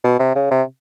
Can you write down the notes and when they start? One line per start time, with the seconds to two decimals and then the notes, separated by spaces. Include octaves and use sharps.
0.04 B2
0.19 C3
0.35 C#3
0.51 C3